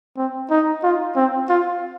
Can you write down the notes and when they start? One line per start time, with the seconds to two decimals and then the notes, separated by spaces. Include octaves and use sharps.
0.17 C4
0.50 D#4
0.83 F4
1.16 C4
1.49 F4